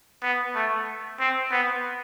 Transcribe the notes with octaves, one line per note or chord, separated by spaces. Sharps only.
B3
A3
C4
B3